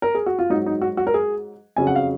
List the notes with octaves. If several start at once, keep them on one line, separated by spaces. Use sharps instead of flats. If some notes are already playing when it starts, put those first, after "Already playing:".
A#4
G#4
F#4
F4
G#2 F#3 D#4
D#4
F#4
F#4
A#4
G#4
F2 C#3 F#3 G#5
F#5
F5